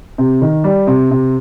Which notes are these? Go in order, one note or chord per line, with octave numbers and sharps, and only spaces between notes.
C3
D#3
G3
C3
C3